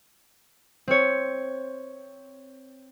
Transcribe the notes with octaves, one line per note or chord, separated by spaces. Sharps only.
C4 C#5